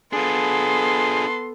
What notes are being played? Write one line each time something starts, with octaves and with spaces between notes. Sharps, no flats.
B3 D4 F4 G#4 A4 C6